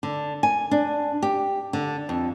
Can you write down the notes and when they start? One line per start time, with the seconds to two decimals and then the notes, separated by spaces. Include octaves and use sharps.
0.03 D3
0.43 G#5
0.71 D4
1.23 G4
1.73 D3
2.09 F2